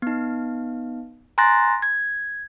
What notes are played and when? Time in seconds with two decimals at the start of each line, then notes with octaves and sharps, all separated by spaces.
0.02 B3 D#4
1.38 G#5 A#5 C6 F#6 A6 A#6
1.82 G#6